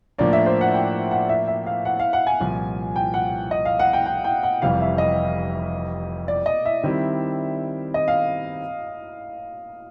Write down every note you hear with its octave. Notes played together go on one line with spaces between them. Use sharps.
A2 F3 A#3 D4 D5
E5
C5
F#5
G5
F#5
E5
E5
F5
F#5
F5
F#5
G#5
C2 A#2 F3
G5
F#5
D#5
F5
F#5
G5
G5
G5
F#5
F1 F2 C3 E3 G3 F5
E5
D#5
D5
D#5
E5
D#3 G3 C4 E4 G4
D#5
F5